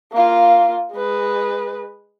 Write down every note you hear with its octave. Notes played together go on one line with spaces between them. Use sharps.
A#3 F4
G#3 B4